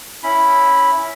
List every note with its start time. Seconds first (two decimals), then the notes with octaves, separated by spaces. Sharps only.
0.23 C#4 E4 B5